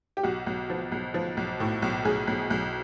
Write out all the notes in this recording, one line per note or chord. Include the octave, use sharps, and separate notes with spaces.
G4
B1 F#4
B1
F3
B1
F3
B1
A2
B1
B1 G#4
B1
B1